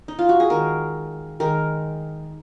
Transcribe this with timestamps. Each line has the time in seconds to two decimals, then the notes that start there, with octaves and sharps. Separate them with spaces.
0.08 D#4
0.19 F4
0.29 F#4
0.40 G#4
0.50 D#3 G#3 A#4
1.40 D#3 G#3 A#4